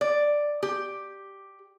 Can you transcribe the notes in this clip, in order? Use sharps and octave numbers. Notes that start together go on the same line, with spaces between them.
D5
G4